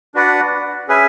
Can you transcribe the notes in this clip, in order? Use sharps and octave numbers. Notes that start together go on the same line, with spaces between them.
D4 F#4 B4 D5 F#5
C#4 G#4 B4 E5 G#5